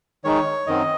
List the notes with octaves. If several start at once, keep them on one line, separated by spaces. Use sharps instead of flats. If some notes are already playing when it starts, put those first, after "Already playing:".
D#3 G#3 D#4 C#5
F#2 D#3 F#3 C4 D#5